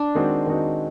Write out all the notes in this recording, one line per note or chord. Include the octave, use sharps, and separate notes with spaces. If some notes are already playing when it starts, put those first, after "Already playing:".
Already playing: D4
D#3 G#3 C4 D#4 F#4
D#3 G#3 C4 D#4 F#4